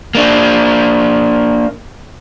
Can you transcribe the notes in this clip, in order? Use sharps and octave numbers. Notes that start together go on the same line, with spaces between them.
A#3 D4